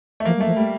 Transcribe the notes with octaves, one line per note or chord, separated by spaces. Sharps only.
A3
F3 A#3
G3
A3
F3
G3 A3